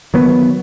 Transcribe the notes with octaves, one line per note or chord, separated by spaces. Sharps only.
D#3 F#3 B3